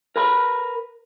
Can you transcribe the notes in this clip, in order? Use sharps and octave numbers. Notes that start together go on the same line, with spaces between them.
A#4 B4 A#5 B5